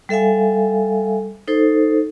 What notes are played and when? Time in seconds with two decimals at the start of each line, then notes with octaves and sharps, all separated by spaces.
0.09 G3 A4 E5 F5 G#5
1.48 D#4 A4 C5